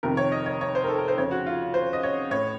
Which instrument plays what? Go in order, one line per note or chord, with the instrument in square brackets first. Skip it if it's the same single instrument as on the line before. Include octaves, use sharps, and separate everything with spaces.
[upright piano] F2 C3 D#3 A#4
C#5
D#5
C#5
C#5
C5
A#4
A4
A#4
C5
F2 C#3 C#5
F#4
F4
C5
D#5
C#5
A2 C#5